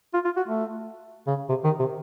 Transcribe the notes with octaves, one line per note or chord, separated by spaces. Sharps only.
F4
F4
F#4
A3
C#3
C3
D#3
C3